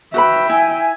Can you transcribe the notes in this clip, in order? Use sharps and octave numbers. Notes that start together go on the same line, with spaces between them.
F#4 B4 E5 G5 B5
E4 G#5